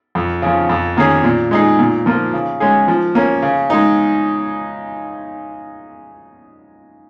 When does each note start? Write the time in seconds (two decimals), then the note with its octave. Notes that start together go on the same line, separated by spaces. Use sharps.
0.15 F2
0.42 C#3 F3
0.69 F2
0.97 D#3 A#3 C#4 G#4
1.24 A#2
1.51 G#3 D#4 G#4
1.79 A#2
2.06 F3 A#3 F4
2.34 C#3
2.60 G#3 C#4 G#4
2.88 F3
3.15 A#3 C#4
3.42 C#3
3.70 G#3 D#4